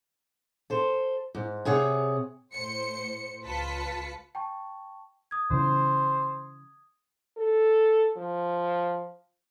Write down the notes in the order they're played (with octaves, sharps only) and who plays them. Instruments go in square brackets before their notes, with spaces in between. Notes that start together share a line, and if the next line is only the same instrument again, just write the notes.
[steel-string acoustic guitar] A4 C5
G#2
C3 G#4 C#5 F#5
[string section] A2 C5 C#7
C#2 F4 B4 A5 B6 C#7
[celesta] G5 A5 C#6
D#6 G#6
[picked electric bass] C#3 E3 [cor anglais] C5
[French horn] A4
F3